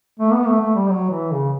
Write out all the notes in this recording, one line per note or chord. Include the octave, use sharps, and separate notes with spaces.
A3
B3
A3
A3
G3
F#3
E3
C#3